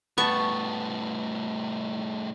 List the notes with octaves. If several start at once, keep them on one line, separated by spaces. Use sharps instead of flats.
A2 G3 B3 A5 C#6